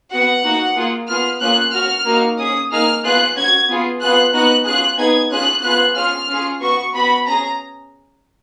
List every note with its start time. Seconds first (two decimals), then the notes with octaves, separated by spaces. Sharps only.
0.11 B3 F#4 F#5
0.43 A#3 D#4 F#4
0.76 A#3 F4 G#4
1.08 B3 F4 G#4 F6
1.41 A#3 C#4 F4 G#4 F#6
1.73 C#4 F#4 F6
2.06 A#3 D#4 F#4
2.38 C#4 G#4 D#6
2.71 A#3 D#4 G#4 F6
3.03 B3 F4 G#4 F#6
3.36 C#4 F#4 G#6
3.68 B3 F4 G#4
4.01 B3 F4 G#4 F#6
4.33 B3 D#4 F#4 F#6
4.65 C#4 F4 G#4 F#6
4.98 B3 D#4 G#4 G#6
5.30 C#4 F4 G#4 F#6
5.63 B3 F4 G#4 F#6
5.95 C#4 F4 G#4 F6
6.28 C#4 F4 G#4
6.61 B3 F#4 C#6
6.93 B3 F#4 B5
7.25 C#4 G#4 A#5